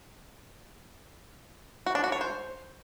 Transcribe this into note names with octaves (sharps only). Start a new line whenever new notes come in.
F#4
D4
F#4
C#5
C5